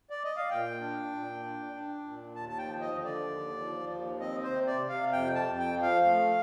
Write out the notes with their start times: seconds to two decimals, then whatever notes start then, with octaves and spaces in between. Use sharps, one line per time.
0.10 D5
0.24 D#5
0.37 F5
0.50 A#2 G5
0.80 D4
1.12 A#2
1.43 D4
1.73 D4
2.04 A#2
2.35 D#2 A5
2.49 A5
2.58 G5
2.66 F3
2.81 D#5
2.97 D3
3.04 D5
3.27 D#2
3.58 F3
3.89 D#2
4.20 C4 D#5
4.43 C5
4.50 C3
4.67 D5
4.82 C3
4.89 F5
5.12 F2 G5
5.35 A5
5.43 F2
5.59 G5
5.74 F3
5.82 F5
6.05 A3